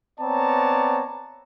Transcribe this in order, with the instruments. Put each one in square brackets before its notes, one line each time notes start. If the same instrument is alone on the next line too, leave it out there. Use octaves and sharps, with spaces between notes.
[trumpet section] B3 C4 C#5 D5 A5 A#5